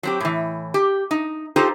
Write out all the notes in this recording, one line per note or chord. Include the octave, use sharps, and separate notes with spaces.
F#3 C4 G4
A2 E3
G4
D#4
D#4 F4 G4 A4 C5